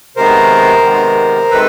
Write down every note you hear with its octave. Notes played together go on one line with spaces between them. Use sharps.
C3 D#3 G#3 B3 A#4 C5
C3 D#3 G#3 B3
C3 D#3 G#3 A4 B4